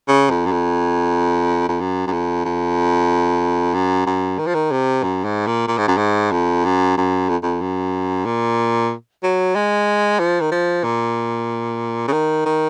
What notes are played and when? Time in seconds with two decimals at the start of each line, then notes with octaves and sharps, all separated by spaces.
0.08 C#3
0.30 F2
0.46 F#2
0.52 F2
1.69 F2
1.80 F#2
2.07 F#2
2.12 F2
2.45 F2
3.74 F#2
4.07 F#2
4.38 D#3
4.47 F3
4.55 D#3
4.72 C3
5.03 F#2
5.25 G#2
5.47 A#2
5.68 A#2
5.78 G#2
5.88 F#2
5.97 G#2
6.32 F2
6.65 F#2
6.97 F#2
7.29 F2
7.43 F2
7.61 F#2
8.25 A#2
9.23 F#3
9.55 G#3
10.19 F3
10.41 D#3
10.52 F3
10.84 A#2
12.08 C#3
12.13 D#3
12.46 D#3